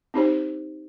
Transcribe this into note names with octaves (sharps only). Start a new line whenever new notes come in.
C4 D#4 G4 C5